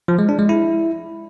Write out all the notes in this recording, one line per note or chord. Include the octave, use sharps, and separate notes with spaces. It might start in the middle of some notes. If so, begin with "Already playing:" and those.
F3
G#3
D4
G#3
E4